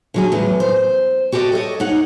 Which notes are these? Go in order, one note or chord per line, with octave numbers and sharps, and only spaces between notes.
D3 F#3 G#4
E2 A2 F#3
C5
F#4 G4 A4 C5 D5 D#5
A4 C#5 D#5
D#4 C#5 F#5